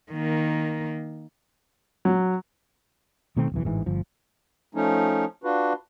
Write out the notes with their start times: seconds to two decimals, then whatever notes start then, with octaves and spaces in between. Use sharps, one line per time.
0.12 D#3 A#3
2.05 F#3
3.37 B2 D#3 A3 C4
3.52 D1 B1 E3
3.64 A1 G#2 E3
3.86 G1 F3
4.75 F3 A3 C#4 D#4
5.44 D4 F4 F#4 B4